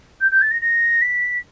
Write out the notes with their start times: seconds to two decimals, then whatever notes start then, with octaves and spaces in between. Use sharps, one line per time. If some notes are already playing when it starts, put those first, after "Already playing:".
0.21 G6
0.31 G6
0.41 A6
0.51 A#6
0.62 A#6
1.02 B6